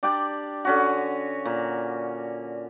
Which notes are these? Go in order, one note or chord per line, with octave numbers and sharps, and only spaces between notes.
D4 G4 D5 G5
D3 C#4 F#4
A#2